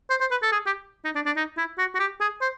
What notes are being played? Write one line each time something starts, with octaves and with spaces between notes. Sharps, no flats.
C5
C5
B4
A4
G#4
G4
D#4
D4
D4
D#4
E4
F#4
F#4
G4
G#4
C5